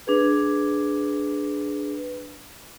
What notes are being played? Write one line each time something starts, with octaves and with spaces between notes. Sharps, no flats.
D4 G#4 B4